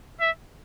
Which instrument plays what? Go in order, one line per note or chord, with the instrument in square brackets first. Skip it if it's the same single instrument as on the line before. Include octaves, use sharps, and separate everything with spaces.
[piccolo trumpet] E5